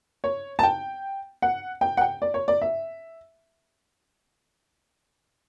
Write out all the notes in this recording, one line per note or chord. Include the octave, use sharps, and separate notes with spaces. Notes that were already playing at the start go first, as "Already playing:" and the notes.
C#5
A5
G5
F#5
G5
F#5
G5
D5
C#5
D5
E5